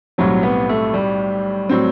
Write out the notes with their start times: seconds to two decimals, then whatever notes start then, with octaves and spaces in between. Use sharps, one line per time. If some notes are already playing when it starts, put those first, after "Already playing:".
0.18 B1 A2 F#3 G3 C4
0.43 B3
0.69 A3
0.94 G3
1.69 A2 F#3 C4